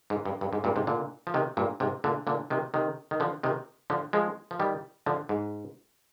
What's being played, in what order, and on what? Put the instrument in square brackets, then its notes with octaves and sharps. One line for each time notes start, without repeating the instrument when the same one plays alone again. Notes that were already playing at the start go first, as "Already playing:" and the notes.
[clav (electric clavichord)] G#2
G2
G2
G#2
G2 A#2
G#2 C3
A#2 D3
F3
C3 D#3
G2 A#2
G#2 C3
A#2 D3
A#2 D3
C3 D#3
C3 D#3
D#3
D3 F3
C3 D#3
D3 F3
F3 G#3
F3
D#3 G3
D3 F3
G#2